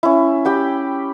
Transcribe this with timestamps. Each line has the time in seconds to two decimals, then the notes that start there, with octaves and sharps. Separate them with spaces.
0.03 C#4 E4
0.45 G4 G5 B5